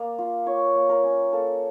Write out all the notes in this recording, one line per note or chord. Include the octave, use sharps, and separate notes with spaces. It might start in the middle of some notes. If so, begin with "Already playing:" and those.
Already playing: A#3 D5
F4
F4 C#5
A#3
A#4
C#4
A#3 A4